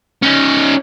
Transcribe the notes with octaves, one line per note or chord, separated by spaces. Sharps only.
C#4 D#4